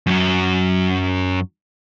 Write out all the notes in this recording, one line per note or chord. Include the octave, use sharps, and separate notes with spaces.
F#2 F#3